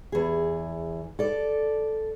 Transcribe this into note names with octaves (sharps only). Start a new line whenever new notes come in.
E2 G#4
A4 D5